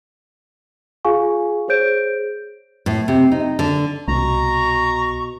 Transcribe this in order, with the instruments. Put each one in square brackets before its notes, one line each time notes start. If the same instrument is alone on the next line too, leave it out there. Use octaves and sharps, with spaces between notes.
[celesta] F4 G#4 F5 G#5 C#6
G#4 C5 C#5 G6 D7
[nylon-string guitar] A2
C3
D#4
D3
[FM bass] C2 [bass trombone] B2 [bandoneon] A#5 [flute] C#6